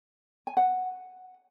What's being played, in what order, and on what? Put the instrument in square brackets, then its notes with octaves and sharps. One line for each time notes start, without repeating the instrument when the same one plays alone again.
[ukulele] G#5
F#5